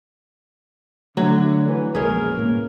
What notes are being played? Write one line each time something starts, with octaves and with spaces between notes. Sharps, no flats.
D3 F#3 A3
E3
E1 A#1 G#3 C#4 G#4 A#4
C2 A2 A#3